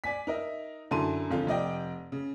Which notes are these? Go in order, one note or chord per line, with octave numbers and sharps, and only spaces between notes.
D5 G#5 B6
D#4 A#4 D#5 E5
F#2 D3 E4 A5 C6 D#7
G#1 F2 D3 F4 A4
F1 D5 D#5 G5
C#3